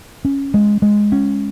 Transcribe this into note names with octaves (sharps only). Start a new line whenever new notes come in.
C#4
G#3
G#3
C#4